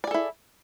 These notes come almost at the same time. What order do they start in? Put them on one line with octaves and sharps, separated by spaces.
D5 G#4 A4 E4